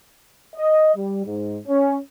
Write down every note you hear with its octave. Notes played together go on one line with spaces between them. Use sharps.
D#5
G3
G#2
C#4